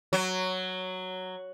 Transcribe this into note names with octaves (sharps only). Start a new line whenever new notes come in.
F#3